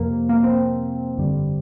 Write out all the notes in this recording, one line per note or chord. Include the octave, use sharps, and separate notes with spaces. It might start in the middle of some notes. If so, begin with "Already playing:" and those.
Already playing: F2 C3 F3 A#3
A#3
C4
G1 F2 D3 G3